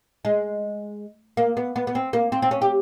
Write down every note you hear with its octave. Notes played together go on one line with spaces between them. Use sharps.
G#3
A#3
B3
B3
B3
C4
A#3
C4
C4
C#4
G4